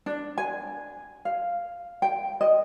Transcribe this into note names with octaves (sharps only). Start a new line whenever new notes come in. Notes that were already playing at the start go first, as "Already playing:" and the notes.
D4
G#5
F5
G5
D#5